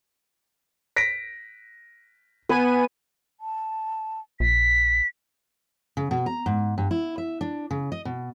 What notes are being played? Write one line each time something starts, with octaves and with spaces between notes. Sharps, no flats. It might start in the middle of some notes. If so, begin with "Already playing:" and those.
A#6 B6 D7
B3 B4 G#5 D#7
A5
A#1 B6
C#3
B2
A#5
G#2
G2
E4
E5
D4
C#3
D#5
B2